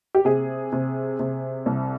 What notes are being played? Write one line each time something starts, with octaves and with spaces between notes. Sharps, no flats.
G4
C3 G#4
C3
C3
C2